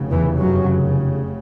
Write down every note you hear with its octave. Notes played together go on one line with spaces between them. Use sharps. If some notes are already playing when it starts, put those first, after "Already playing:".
Already playing: F1 C#3
E2 E3
F#2 F#3